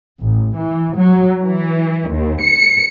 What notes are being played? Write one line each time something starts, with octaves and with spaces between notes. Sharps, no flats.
A1
E3
F#3
E3
D#2
C#7